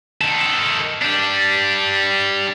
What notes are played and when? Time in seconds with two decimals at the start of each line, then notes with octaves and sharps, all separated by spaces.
0.21 D#3 A4
1.02 G3 D4